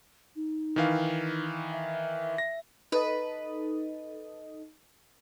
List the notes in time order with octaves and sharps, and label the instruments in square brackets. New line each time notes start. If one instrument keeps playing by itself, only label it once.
[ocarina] D#4
[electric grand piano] D#3 E3 F5
[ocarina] E5
[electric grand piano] A#6
[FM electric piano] D#4 A4 D#5 [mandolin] B4